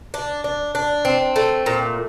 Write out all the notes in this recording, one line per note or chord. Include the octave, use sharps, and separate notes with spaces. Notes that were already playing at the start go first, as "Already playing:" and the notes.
D4
D4
D4
C4
A3
A#2